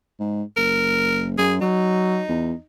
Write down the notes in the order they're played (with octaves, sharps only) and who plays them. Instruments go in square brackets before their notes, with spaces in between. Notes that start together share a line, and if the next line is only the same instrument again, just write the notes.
[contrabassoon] G#2
[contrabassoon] F#1 [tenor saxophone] A#4
[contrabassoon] F#2 [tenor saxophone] G#4
[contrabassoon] F#3 [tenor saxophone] D#4
[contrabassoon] E2